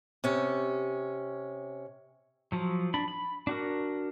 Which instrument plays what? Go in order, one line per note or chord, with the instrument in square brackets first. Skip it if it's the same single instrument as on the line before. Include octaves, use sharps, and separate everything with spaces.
[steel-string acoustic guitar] C3 C#4
[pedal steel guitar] F3 F#3
D4 B5
B5
D4 F#4 A#4